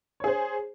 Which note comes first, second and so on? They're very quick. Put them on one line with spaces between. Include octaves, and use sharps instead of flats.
C#5 G#4 C5